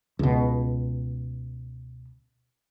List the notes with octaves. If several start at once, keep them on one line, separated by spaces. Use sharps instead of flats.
C#2 B2